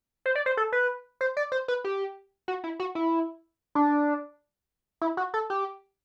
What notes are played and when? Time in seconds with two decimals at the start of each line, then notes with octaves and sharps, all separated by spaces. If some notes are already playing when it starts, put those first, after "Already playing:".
0.26 C5
0.35 D5
0.46 C5
0.57 A4
0.72 B4
1.21 C5
1.37 D5
1.52 C5
1.68 B4
1.85 G4
2.48 F#4
2.64 E4
2.80 F#4
2.95 E4
3.75 D4
5.02 E4
5.17 F#4
5.34 A4
5.50 G4